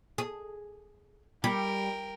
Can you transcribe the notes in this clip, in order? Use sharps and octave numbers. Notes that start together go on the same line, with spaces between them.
G#4
G3 A#4 G5